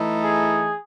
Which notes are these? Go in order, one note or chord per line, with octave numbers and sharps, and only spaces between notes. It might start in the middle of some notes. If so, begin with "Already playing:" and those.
Already playing: E3 A3 D#4
G#4